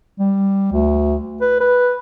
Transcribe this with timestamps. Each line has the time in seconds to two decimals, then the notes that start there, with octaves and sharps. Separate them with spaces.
0.20 G3
0.73 D2
1.41 B4
1.60 B4